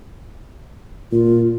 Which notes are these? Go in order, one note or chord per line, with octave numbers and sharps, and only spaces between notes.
A#2 F4